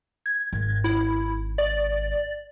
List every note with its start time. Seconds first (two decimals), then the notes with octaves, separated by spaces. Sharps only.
0.26 G#6
0.53 G#1
0.84 E4
1.58 D5